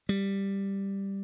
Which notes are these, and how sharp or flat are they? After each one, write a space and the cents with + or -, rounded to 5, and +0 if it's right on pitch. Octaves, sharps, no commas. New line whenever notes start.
G3 +5